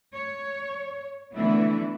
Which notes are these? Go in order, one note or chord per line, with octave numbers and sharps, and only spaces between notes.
C#5
D3 E3 F#3 A3 B3 E4